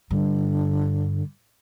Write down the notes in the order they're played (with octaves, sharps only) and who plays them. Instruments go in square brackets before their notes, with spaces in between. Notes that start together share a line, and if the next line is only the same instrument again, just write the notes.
[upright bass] G2 [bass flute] D3